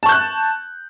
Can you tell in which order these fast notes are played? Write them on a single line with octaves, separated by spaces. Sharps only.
A5 C#6 G6 F#6